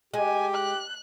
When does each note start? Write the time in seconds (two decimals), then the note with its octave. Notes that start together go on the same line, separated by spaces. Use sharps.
0.14 G#3 G4 G#5
0.55 F#6